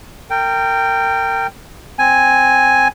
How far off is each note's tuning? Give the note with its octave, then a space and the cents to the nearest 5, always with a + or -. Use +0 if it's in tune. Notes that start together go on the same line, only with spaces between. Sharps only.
A#4 -30 G5 +0
C4 +0 G#5 +0